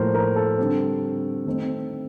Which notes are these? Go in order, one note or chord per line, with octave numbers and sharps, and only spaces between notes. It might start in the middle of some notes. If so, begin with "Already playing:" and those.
Already playing: A2 F3 A#3 A#4 C5
A#4
A4
D3 G3 C4
D#3 A3 C4